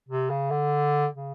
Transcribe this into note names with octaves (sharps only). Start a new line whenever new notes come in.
C3
C#3
D3
C#3